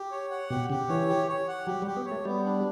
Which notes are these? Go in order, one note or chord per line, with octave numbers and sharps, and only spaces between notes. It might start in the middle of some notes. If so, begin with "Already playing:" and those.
Already playing: G4
C#5
F#5
B2 G4
C#3 G4
E3 C#5
G4
C#5
F#5
F#3 G4
G3
G4
B3
C#5
A3
G3 B3
D4